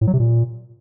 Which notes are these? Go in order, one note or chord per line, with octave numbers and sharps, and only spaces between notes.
A2
F#3
C3
A#2